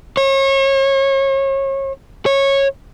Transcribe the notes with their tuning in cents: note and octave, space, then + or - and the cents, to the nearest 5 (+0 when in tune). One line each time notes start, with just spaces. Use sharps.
C#5 -35
C#5 -15